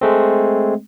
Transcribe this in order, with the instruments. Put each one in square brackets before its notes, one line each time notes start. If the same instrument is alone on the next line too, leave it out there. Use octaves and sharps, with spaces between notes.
[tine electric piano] G#3 A3 C4